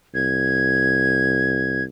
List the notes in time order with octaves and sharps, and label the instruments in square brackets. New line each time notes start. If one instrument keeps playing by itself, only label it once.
[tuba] C2 [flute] G#6